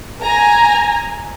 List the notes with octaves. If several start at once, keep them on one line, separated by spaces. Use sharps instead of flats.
G#5 A#5